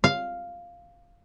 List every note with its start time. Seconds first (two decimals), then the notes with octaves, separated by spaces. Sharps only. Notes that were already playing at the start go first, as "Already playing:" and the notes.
0.04 F5